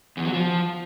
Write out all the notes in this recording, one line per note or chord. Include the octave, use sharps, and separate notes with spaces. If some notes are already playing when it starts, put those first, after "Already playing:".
E2
F#3
F3